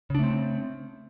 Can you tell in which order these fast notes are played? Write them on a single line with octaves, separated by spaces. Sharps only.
C#3 D4 A3 C4